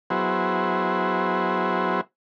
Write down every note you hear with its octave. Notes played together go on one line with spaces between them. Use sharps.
F#3 B3 E4 F#4 G#4 C5